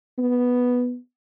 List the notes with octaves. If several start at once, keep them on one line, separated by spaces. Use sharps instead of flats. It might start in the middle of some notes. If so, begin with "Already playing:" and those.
B3